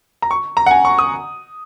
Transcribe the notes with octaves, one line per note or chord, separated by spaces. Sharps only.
A#5
C#6
A#5
F#5
G#5
C#6
D#6